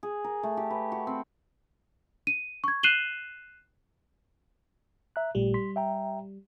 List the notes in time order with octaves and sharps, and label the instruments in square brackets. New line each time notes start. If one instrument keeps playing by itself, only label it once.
[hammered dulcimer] G#4
A#4
A3
G4
B4
F#4
C4
[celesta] D#7
C#6 G#6
F#6 C7 D#7 E7 F#7 G7
[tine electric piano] E5 A#5 F#6
[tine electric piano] A1 A#2 A3 [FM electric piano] G3
[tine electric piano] C6 B6
E5 G5 A#5